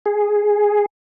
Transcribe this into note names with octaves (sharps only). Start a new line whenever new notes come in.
G#4